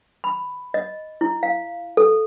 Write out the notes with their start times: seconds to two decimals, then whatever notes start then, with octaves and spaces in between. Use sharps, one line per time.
0.24 B5
0.74 D#5
1.21 E4
1.43 F5
1.97 A4